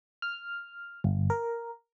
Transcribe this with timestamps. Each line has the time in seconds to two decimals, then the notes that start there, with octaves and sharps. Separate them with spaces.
0.22 F6
1.04 G1
1.30 A#4